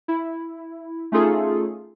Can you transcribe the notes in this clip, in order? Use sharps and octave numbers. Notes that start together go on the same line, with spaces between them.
E4
A3 C#4 D#4 F4 G#4 A4